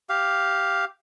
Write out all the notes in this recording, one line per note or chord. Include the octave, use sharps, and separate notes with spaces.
G4 F5